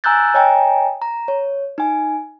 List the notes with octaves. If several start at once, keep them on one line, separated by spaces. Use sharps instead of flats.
G#5 A#5 E6 F#6 G6 A6
C#5 D#5 G5 G#5 A#5
A#5
C#5
D#4 G#5